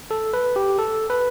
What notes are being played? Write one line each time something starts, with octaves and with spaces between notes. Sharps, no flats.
A4
B4
G4
A4
B4